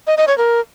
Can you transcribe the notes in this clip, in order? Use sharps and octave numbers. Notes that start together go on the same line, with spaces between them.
D#5
D#5
C#5
A#4